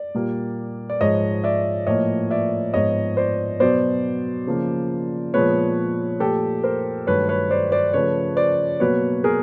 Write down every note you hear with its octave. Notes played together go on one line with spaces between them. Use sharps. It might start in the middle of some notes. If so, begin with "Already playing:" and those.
Already playing: D5
A#2 G3 A#3
D5
G#2 F3 G#3 C#5 D#5
D5 E5
A2 F3 A#3 C#5 D#5
D5 E5
G#2 F3 G#3 B3 C#5 D#5
C5 D5
B2 F#3 B3 C5 D5
C#3 F3 A#3
A#2 F3 G#3 B3 B4 C#5
A#2 F3 A3 G4 A4
A#4 C5
G2 D#3 F#3 A3 B4 C#5
B4 C#5
C5 D5
C5 D5
C#3 F3 A3 B4 C#5
C5 D5
B2 F#3 A#3 B4 C#5
G#4 A#4